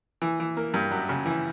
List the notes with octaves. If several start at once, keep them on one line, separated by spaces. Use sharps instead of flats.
E3
E3
A#3
G2
F#2
C#3
E3